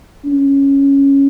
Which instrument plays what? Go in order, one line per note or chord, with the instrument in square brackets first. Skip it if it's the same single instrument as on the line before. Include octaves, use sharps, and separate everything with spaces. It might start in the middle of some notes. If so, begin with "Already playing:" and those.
[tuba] C#4